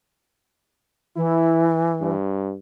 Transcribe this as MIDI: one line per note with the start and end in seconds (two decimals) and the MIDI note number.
1.16 2.15 52
1.16 1.69 64
2.01 2.56 43